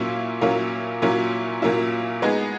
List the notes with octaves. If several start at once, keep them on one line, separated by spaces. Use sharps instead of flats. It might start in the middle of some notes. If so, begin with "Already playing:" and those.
Already playing: A#2 F#3 A#3 C#4 E4
A#2 F#3 A#3 C#4 E4
A#2 F#3 A#3 C#4 E4
A#2 F#3 A#3 C#4 E4
G#3 B3 D#4 G#4